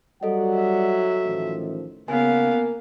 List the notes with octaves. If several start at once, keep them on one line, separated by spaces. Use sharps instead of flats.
F#3 G3 A4 D5 D#5 F#5
E5
A1 D#3 F3
C#3 A#3 B3 F5 G#5